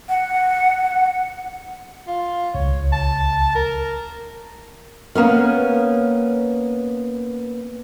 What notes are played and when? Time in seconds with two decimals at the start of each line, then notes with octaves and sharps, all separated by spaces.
0.09 F#5
2.07 F4
2.55 C#2 C#5
2.92 A5
3.55 A#4
5.15 A#3 B3 C#4